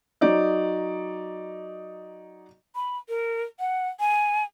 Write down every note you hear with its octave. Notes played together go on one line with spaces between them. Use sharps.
F#3 D#4 D5 D#5
B5
A#4
F#5
G#5